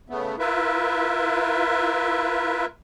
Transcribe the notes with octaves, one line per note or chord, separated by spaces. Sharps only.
C#3 A3 B3
E4 F4 A#4 B4 E5